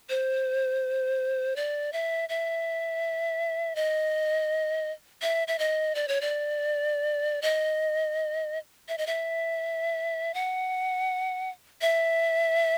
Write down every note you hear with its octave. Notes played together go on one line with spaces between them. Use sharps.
C5
D5
E5
E5
D#5
E5
E5
D#5
D5
C#5
D5
D#5
E5
D#5
E5
F#5
E5